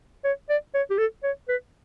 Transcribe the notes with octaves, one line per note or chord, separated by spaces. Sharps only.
C#5
D5
C#5
G4
A4
C#5
B4